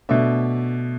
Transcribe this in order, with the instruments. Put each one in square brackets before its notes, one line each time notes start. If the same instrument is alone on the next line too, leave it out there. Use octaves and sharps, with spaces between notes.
[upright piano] B2 A3 D4 E5